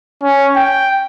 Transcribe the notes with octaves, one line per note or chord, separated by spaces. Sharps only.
C#4
G5